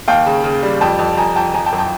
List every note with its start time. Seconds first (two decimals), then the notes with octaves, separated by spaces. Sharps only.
0.08 D#2 F5 G5
0.26 C#3
0.44 C#3
0.63 G3
0.81 F2 G5 A5
0.99 F2
1.17 F2 G#5 A#5
1.36 F2 G5 A5
1.54 F3 G#5 A#5
1.66 G5 A5
1.73 F#2
1.78 G5 A5